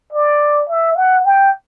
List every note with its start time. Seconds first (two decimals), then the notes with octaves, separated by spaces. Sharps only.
0.13 D5
0.69 E5
0.96 F#5
1.25 G5